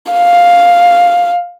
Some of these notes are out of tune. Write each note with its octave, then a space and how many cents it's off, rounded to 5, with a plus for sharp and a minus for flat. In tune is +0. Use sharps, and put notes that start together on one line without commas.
F5 +5